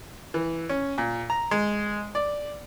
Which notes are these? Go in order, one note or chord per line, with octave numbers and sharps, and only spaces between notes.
E3
C#4
A#2
A#5
G#3
D5